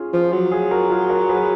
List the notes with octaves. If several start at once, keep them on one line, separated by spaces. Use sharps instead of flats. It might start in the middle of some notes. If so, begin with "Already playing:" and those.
Already playing: C#4 F4 G#4
F3
F#3
F4 G#4
F#4 A#4
F4 G#4
F#4 A#4
G#4 B4